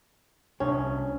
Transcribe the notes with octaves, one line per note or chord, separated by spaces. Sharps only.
C2 C#4 D4